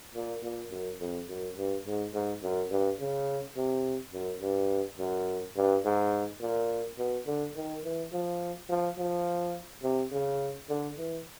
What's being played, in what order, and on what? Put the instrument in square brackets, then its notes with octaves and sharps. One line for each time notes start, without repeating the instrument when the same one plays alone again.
[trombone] A#2
A#2
F#2
F2
F#2
G2
G#2
G#2
F#2
G2
C#3
C3
F#2
G2
F#2
G2
G#2
A#2
B2
D3
D#3
E3
F3
F3
F3
C3
C#3
D3
E3